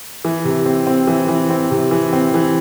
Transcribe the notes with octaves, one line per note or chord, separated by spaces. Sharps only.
E3
C3
C4
C4
E3
E3
C4
C3
E3
C4
E3